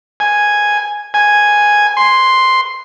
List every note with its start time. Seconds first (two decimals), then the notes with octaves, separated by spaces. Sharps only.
0.20 G#5
1.14 G#5
1.97 C6